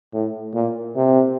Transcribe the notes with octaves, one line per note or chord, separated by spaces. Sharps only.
A2
A#2
C3